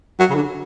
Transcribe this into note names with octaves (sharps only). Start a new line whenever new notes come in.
F#3
C#3
D3